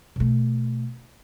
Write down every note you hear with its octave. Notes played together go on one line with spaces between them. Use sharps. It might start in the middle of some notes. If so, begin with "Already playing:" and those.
B2 A3